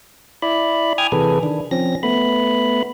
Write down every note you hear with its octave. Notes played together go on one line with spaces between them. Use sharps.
E4 D5 B5
G5 G#5 D#6 F6 G#6
C3 E3 G#4 A4 B4
D#3 D4
F3 C4 C#4 A#6
A3 B3 B5